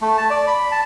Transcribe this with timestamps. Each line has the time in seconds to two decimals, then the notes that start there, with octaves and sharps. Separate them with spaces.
0.01 A3
0.18 A5
0.30 D5
0.47 B5
0.72 A5